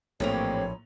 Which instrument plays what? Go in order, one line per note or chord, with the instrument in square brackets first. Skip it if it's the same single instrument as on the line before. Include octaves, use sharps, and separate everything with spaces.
[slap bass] A#1 [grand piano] A2 A#3 F7 [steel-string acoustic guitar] E3 C4 G4 [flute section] C#5